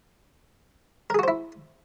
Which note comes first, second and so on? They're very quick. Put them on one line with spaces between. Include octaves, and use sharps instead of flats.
A#4 G#4 F#4 C5 E4